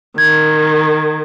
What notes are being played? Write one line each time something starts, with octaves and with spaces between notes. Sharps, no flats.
D#3 G#6